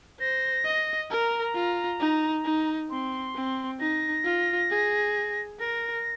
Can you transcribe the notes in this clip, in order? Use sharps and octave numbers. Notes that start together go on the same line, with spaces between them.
C5 A#6
D#5
A#4 A#5
F4
D#4
D#4
C4 C6
C4
D#4 A#6
F4
G#4
A#4 A#6